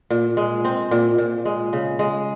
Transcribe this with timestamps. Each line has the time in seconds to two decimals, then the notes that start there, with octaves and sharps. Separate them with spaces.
0.10 A#2
0.37 G#3
0.65 C4
0.91 A#2
1.18 A#2
1.45 G#3
1.73 C#3
1.99 G#3